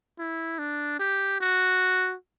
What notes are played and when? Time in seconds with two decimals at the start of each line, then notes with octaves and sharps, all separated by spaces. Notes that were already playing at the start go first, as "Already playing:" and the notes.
0.19 E4
0.59 D4
1.00 G4
1.41 F#4